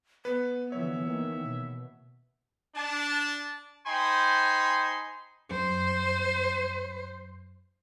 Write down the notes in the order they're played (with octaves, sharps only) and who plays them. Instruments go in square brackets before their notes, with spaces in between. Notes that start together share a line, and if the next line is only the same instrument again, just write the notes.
[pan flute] B3 [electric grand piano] B4
[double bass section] D3 E3 F3 [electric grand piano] C#5 [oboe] E5
[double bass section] D#3 E3 A#3
B2
[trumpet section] D4 A5
D#4 C5 G5 G#5 B5 C6
[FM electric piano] F#2 [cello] C5